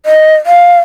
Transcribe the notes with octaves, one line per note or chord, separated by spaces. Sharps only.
D#5
F5